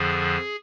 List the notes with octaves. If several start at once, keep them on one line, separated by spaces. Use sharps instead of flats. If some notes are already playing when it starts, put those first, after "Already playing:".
Already playing: F2 D3 F3 G#4